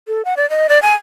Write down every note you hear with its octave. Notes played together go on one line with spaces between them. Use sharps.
A4
F#5
D5
D#5
D5
G#5